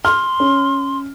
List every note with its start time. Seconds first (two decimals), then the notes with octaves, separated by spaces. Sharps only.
0.05 C6 F6
0.40 C#4